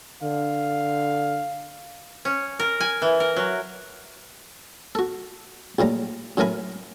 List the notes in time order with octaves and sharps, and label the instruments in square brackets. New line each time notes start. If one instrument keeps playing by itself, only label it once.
[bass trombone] D3 [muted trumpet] F5
[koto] C#4
A#4
G#5
E3
A#4
F#3
[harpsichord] F#4 A4
A#1 A2 G3 A#5
F#2 A2 E3 A#4 G#5 B5